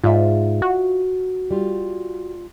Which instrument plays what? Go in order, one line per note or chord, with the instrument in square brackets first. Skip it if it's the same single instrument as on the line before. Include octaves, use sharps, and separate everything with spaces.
[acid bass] G#2 [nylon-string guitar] F4 D5 E5
[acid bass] F#4
[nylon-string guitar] G3 F4